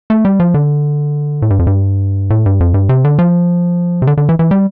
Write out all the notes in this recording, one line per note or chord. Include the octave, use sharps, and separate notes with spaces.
A3
G3
F3
D3
A2
G2
F2
G2
A2
G2
F2
G2
C3
D3
F3
C3
D3
D3
E3
E3
G3